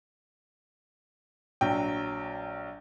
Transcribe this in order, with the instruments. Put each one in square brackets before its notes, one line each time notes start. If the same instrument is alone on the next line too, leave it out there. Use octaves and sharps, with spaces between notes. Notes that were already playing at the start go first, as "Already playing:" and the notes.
[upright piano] A#1 F#3 G5